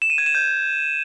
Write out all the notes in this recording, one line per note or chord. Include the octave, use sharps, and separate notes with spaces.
E7
D#7
G#6
E7
G6